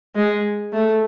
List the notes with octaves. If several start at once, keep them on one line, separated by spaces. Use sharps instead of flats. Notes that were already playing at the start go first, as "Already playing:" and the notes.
G#3
A3